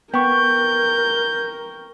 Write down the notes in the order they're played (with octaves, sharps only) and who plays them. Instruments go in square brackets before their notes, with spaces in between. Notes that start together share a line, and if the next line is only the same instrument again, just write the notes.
[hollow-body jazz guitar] B3 [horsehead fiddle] A#4 [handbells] G5 C#6 [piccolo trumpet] G6